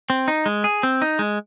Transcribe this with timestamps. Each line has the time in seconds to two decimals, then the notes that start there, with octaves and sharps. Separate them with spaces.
0.10 C4
0.28 D#4
0.46 G#3
0.64 G#4
0.83 C4
1.02 D#4
1.19 G#3